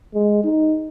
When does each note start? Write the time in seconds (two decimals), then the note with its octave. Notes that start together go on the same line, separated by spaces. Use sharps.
0.15 G#3
0.44 D#4